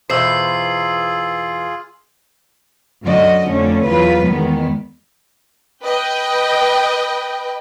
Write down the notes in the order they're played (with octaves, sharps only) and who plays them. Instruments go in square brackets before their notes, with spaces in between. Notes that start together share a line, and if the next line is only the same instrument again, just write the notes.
[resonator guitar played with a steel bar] E2 B2 C5 [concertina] F4 G#4 [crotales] E6 C7
[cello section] F#2 D3 F#4 D#5
F2 D3 A3 C#4
E2 F#3 F4 B4
E2 D#3 G#3 B3
[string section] B4 D#5 G5